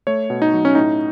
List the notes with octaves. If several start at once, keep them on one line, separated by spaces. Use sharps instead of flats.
A3 C#5
B2
D#4
F#3
C#4
A2 D#4